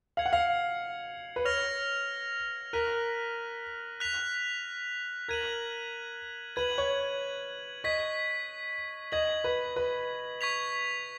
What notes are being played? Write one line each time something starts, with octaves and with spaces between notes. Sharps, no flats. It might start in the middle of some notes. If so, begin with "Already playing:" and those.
F5 G#6 C#7 F#7
F#5
F5
B4
C#5 F6 A#6 F7
A#4 F#6 B6 D#7 F#7
F#6 B6 F7
A#4 G#6 D#7 F#7
B4 G#6 D#7 F#7
C#5
D#5 C#6 G#6 B6
D#5 G#6 B6 F#7
B4
B4
C#6 G#6 B6 F7